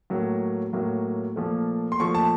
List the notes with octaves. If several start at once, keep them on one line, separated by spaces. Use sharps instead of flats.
A2 F#3 A#3
A2 F#3 A#3
A#2 F3 A3
C6
A#2 F3 A3 C#6
A5